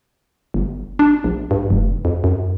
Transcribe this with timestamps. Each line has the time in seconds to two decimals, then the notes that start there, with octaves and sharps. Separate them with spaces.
0.54 G1
0.99 D4
1.24 A#1
1.51 G2
1.70 F1
2.05 F2
2.24 F#2